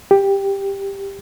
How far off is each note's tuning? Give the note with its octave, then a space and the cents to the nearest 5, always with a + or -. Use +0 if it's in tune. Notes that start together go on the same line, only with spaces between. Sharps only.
G4 +10